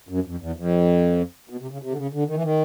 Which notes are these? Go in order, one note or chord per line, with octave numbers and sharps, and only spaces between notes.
F#2
F2
E2
F2
B2
C3
C#3
C3
D3
C#3
D3
D#3
E3
D#3